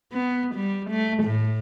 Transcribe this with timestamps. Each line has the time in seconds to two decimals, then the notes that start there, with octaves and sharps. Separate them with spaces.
0.13 B3
0.55 G3
0.90 A3
1.23 A2